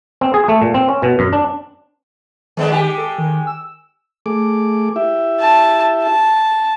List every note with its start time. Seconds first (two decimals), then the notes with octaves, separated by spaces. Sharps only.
0.21 C4
0.34 G#4
0.48 A3
0.62 A#2
0.74 C4
0.89 C#4
1.02 B2
1.19 F#2
1.33 D4
2.57 D#3 G#3 B3 D4
2.70 G#3 G4
2.98 A4
3.18 D#3
3.47 E6
4.26 A3 G#4 D6
4.96 E4 G4 E5
5.41 A5
6.03 A5